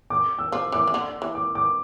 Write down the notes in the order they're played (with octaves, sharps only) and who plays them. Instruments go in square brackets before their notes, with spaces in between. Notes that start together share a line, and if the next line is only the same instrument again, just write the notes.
[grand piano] D6
E6
[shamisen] F3 [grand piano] D6
[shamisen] E3 [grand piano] D6
[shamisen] E3
D3
E3
[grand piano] D6
D6